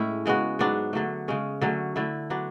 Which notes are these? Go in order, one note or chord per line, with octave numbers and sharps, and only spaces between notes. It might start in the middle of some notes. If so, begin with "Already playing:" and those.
Already playing: A2 G#3 C#4 E4
C#3 G#3 B3 F#4
G#2 F#3 B3 D4
D3 F#3 A3
C#3 G#3 C#4
D3 F#3 A3 C#4
D3 A3 E4
F#3 B3 D4